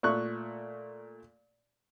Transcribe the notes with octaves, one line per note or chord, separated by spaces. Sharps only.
A#2 A3 C#6 F#6